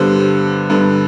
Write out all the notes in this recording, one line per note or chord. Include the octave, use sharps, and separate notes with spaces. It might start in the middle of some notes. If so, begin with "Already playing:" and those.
Already playing: G2 D3 G3 B3 C5
G2 D3 G3 B3